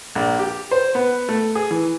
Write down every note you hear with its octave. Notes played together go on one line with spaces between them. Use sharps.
A#1
G4
C5
B3
A3
G#4
E3